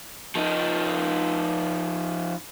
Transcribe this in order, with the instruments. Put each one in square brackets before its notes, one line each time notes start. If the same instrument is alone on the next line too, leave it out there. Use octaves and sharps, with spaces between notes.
[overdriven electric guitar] F3 D#4